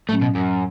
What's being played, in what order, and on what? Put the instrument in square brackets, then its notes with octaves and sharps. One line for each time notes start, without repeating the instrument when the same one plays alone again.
[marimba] A2 F#3 C#4 [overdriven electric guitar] A3
[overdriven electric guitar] B2
F#2